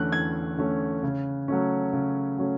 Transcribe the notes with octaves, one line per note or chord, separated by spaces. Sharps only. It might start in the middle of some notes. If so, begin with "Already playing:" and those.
Already playing: E2 D3 A3 C#4 F#6
E2 G#6
D3 A3 C#4
C#3
F#3 A3 C#4
C#3
F#3 A3 C#4